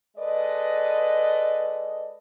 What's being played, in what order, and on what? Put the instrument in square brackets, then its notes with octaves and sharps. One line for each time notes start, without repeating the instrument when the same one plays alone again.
[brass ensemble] G#3 A4 B4 D5 D#5